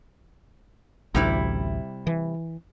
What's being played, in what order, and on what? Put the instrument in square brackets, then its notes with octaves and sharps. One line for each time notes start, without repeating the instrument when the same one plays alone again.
[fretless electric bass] A1 D2 [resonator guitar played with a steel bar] C3 G3 E4
[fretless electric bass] E3